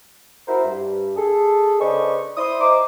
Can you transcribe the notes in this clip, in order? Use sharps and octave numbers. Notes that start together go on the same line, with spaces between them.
E4 F#4 A#4 C5
G2
G#4 A4
C#3 D4 B4 C5 D#5 C#6
E4 C5 D5 C6 D#6
C5 D#5 A#5 D6